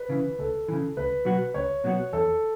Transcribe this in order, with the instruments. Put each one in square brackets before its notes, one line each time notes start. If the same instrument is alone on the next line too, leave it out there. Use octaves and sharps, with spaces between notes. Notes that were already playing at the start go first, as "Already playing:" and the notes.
Already playing: [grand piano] B4
[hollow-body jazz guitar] C#3 E3
[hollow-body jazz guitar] C#2 [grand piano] A4
[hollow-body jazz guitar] C#3 E3
[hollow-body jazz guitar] C#2 [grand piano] B4
[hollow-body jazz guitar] B2 F#3 B3 F#4
[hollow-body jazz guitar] C#2 [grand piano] C#5
[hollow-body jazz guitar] B2 F#3 B3 F#4
[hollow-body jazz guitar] E2 [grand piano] A4